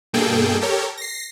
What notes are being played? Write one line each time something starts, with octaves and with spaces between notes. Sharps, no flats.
G2 B2 A#3 G#4 A4 G5
G4 A4 A#4 C#5
A#6 C7